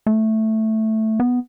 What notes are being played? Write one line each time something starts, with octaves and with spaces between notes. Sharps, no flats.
A3
B3